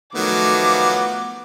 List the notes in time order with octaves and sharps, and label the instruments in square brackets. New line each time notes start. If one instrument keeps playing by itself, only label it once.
[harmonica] D#3 F#3 [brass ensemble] F3 A3 [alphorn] B3 [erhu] D6